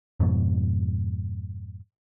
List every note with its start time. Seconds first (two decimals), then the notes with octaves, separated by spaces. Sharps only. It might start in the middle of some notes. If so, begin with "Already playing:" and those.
0.20 F2 G#2 B2